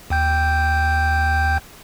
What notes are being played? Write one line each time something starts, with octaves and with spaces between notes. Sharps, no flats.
D#2 G5 G6